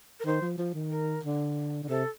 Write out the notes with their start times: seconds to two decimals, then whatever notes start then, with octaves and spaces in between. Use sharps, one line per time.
0.20 A#4
0.26 D#3 C5
0.42 F3
0.58 F3
0.74 D#3
0.90 A#4
1.24 D3
1.83 D3
1.89 C3 A4